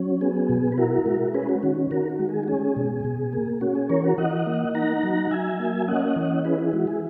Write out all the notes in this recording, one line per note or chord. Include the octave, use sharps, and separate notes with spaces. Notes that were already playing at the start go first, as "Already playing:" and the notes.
Already playing: F#3 C#4
B3 G#4
B2
B4
E4 F#4 A#4
G#3
C#4 G#4 B4
F#4
D#3 F#4
D#3 F#4 A#4
F#4
G#3
G#4
F#4
C#4 G#4
B2
B2
A#3
C#4 F#4
G#4
E3 A#4 C#5
F#4 A#4
E3 D#5 F#5
A#3
D#4 F#5 A#5
F#3
F#5
F#3 E5 G#5
A#3
C#4 D#5 F#5
E3
E4 G#4 B4
G#4
G#3 F#4
G#4